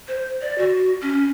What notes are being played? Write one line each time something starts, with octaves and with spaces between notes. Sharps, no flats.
C5
D5
F#4
C#4